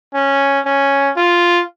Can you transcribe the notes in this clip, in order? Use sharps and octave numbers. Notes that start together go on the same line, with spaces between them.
C#4
C#4
F4